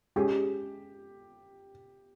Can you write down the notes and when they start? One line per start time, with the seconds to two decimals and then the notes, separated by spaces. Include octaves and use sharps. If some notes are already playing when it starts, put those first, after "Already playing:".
0.16 G#3 C#4 G4 G#4